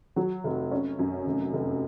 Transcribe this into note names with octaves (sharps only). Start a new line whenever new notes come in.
F#3
F1
C#4
F#2
F1
F1